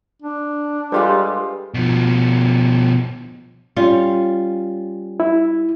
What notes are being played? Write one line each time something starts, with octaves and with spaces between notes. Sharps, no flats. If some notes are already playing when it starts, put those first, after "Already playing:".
D4
G3 G#3 F4 G4 A4 B4 C5
B2 F3
G3 C#4 F4
E4